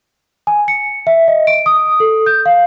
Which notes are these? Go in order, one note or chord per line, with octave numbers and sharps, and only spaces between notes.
G#5
C#7
E5
D#5
D7
D#6
A4
G6
F5